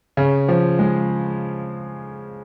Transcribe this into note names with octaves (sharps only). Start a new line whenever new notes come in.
C#3
F3
G#3